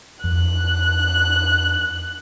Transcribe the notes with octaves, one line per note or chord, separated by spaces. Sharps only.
F2 F#6